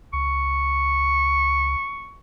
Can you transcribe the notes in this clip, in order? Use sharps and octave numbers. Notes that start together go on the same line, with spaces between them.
C#2 C#6